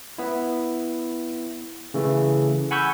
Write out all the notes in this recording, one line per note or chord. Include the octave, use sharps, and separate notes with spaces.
B3 E4
C#3 E3 A3
F#5 G#5 B5 C#6 E6 G6